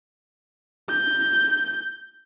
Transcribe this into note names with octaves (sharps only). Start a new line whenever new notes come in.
G6